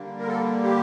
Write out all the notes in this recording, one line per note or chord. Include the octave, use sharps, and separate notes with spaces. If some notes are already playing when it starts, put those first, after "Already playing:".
Already playing: D3 G3 A#3
A#4
A4
G4